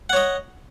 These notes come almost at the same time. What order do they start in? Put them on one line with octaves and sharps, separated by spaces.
F#5 C#5 D#5